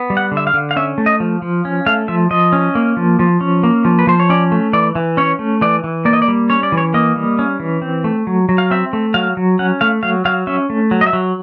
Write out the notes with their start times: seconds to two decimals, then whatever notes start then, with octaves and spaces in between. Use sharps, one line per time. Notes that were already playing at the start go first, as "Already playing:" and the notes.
Already playing: B3
0.10 G3
0.17 F#5
0.32 D3
0.37 E5
0.47 F5
0.54 D3
0.71 F5
0.76 C#4 E5
0.98 A3
1.06 D#5
1.20 F3
1.42 F3
1.65 C#4
1.86 A3 F5
2.08 F3 E5
2.31 F3 D#5
2.53 C#4
2.75 A#3
2.97 F3
3.19 F3
3.41 C#4
3.63 A#3
3.85 F3
3.99 B4
4.07 F3 C5
4.20 C#5
4.30 C#4 D5
4.52 A3
4.73 E3 D5
4.95 E3
5.17 C#4 C#5
5.39 A3
5.61 E3 D5
5.84 E3
6.05 A#3 D5
6.13 D#5
6.22 D5
6.28 G3
6.50 C#4 C#5
6.63 D5
6.72 E3
6.78 C#5
6.94 A#3 D#5
7.16 G3
7.39 C#4
7.60 E3
7.82 C4
8.04 A3
8.27 F#3
8.49 F#3
8.58 F5
8.71 C4 E5
8.93 A3
9.14 F#3 F5
9.37 F#3
9.59 C#4 F#5
9.81 A3 F5
10.03 F#3 F5
10.25 F#3 F5
10.47 C#4 E5
10.70 A3
10.91 F#3
11.01 D#5
11.06 E5
11.13 F#3